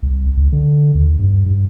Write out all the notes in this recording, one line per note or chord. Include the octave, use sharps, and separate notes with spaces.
C2
C#2
D3
D#2
G2
G2